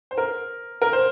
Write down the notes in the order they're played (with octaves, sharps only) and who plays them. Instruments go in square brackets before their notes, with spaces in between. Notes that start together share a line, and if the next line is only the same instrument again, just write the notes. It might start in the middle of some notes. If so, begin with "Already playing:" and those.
[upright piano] C5
A#4
A#4
C5